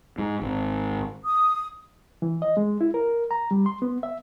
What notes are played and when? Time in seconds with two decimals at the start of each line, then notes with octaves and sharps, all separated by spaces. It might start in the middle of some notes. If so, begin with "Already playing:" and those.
0.18 G#2
0.42 G#1
1.25 D#6
2.22 E3
2.42 D#5
2.57 G#3
2.81 E4
2.94 A#4
3.31 A#5
3.51 G3
3.66 C6
3.82 B3
4.03 E5